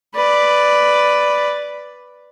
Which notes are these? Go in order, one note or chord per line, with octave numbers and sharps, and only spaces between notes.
B4 D5